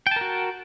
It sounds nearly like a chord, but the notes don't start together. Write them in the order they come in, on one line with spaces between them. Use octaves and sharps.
G5 A5 A#4 F#4